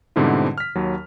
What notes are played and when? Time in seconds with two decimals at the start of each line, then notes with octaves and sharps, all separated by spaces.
0.16 G#2 B2 D3 G3 C4 E4
0.58 F6 B6
0.76 D#2 F#3